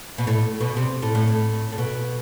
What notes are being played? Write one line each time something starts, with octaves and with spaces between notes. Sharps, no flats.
B2
A2
B2
C3
A2
A2
A2
A2
B2